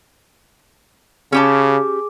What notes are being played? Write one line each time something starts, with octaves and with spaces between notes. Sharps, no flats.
C#3 C#4 G4 G#4 A5 D6